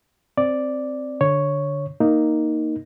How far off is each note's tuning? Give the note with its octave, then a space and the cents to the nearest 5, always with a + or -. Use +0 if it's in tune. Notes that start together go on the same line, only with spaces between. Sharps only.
C4 +0 D5 +0
D3 +0 C#5 +0
A#3 +0 D#4 +0